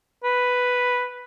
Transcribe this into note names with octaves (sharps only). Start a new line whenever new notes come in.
B4